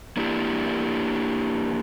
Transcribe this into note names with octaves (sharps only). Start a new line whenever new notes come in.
A#3 D4 E4 G4